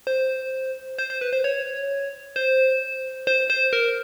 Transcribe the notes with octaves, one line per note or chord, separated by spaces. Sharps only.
C5
C5
C5
B4
C5
C#5
C5
C5
C5
A#4